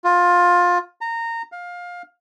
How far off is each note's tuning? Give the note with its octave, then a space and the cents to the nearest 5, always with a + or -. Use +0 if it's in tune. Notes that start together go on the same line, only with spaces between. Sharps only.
F4 +20
A#5 -20
F5 +20